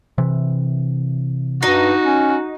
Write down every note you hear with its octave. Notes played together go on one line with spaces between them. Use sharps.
C3 E3
G2 D#4 F#4
C#4